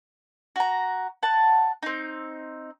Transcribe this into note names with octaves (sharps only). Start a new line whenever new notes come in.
F#4 A#5
F#5 A5
C4 D#4